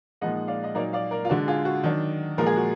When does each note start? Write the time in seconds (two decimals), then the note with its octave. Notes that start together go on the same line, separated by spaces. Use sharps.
0.21 A#2 F3 G#3 D#4 D#5 F#5
0.48 D5 F5
0.64 D#5
0.75 A#2 F#3 A#3 D#4 A#4 D5
0.93 D5 F5
1.11 A#4 D5
1.25 F4
1.29 D3 G#3 D4 F#4
1.48 F4 G#4
1.65 F#4
1.83 D#3 F#3 D4
2.38 A#2 F3 G#3 A#4
2.47 G#4
2.56 F#4